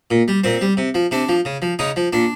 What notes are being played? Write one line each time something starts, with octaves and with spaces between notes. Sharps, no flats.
A#2
G3
A#2 C4
G3
C3
F3
C3 D4
F3
C#3
F3
C#3 D#4
F3
A#2 D4